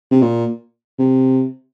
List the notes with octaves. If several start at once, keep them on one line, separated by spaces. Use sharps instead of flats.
C3
A#2
C3